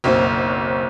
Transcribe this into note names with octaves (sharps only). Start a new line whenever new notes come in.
F#1 B1 C4